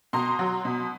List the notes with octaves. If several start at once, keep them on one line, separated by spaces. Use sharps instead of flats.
B2 A#5 C6
F#3
B2